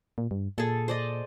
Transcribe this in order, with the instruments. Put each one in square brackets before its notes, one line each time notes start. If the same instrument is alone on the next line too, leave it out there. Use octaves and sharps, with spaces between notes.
[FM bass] A#2
G2
[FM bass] A#2 [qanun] G#4 A4
[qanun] C5 D5 D#5